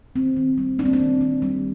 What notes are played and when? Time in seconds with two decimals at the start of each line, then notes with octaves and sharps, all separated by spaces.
0.16 D#3 C4
0.36 D#3
0.58 G3
0.79 A#3 D4
0.85 C4
0.93 D4
1.00 D#3
1.21 D#3
1.42 G3